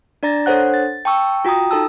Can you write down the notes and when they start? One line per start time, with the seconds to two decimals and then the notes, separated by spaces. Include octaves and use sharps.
0.23 D4 D5 A#5 A6 A#6
0.46 D4 A4 C5 C#5 F#5 F#6
0.74 A6
1.05 G5 A5 C#6 E6
1.45 F4 F#4 G5 A#5 D#6
1.71 D#4 A4 A5 E6